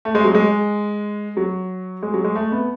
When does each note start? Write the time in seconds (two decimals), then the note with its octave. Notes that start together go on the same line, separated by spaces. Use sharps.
0.05 A3
0.15 G#3
0.25 F#3
0.35 G#3
1.37 F#3
2.03 G#3
2.14 F#3
2.24 G#3
2.35 A3
2.52 B3